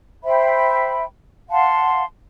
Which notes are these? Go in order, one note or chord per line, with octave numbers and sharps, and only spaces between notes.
C5 E5 G5 B5
F5 F#5 A5 C6